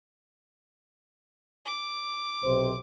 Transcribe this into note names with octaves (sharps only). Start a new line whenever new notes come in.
D6
B1 C3 C5